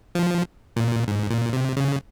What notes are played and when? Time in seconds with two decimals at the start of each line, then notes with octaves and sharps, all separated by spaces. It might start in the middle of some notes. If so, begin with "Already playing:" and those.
0.15 F3
0.76 A#2
1.08 G#2
1.30 A#2
1.53 C3
1.77 C#3